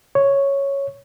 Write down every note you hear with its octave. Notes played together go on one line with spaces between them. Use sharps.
C#5